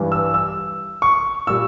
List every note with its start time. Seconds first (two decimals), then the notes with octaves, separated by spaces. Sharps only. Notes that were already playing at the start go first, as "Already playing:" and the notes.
Already playing: G2 E3 G3
0.12 E6
0.34 E6
1.02 C#6
1.47 A#2 G3 E6